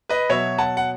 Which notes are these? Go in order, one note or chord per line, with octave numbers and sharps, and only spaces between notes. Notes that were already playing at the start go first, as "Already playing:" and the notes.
B4 D#5
B2 F#3 C#5 E5
F#5 A5
F#5